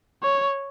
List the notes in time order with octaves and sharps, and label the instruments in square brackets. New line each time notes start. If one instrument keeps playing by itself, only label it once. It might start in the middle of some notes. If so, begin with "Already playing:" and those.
[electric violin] C#5